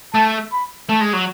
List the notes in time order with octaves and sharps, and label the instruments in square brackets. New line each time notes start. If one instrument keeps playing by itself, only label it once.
[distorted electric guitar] A3 [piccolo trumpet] A5
[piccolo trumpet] B5
[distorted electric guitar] A3 [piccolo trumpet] A5
[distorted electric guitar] G#3
F#3